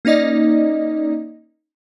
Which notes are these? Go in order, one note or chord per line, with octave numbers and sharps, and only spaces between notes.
A#3 C#4 D#4 D5 D#5